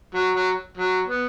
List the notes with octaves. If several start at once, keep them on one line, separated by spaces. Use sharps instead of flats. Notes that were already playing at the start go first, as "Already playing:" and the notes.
F#3
F#3
F#3
B3